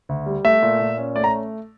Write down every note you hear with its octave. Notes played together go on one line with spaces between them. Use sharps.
D2
G3
A3 E5
A#2
A#2
C#4
A3 D5
A#5